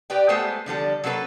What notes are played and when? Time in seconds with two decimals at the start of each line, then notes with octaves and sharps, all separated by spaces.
0.10 G4 B4 D5 G5
0.29 G#3 A3 B3 G4 A4 C5
0.66 D3 F3 G3 A4
1.04 F#3 A#3 C#4 A4 B4